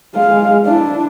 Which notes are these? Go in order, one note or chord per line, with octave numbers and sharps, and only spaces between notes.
G#3 F5
D4 E4